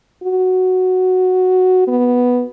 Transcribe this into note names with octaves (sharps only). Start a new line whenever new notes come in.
F#4
B3